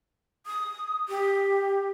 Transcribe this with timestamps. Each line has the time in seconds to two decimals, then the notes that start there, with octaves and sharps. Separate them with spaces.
0.47 D#6
1.09 G4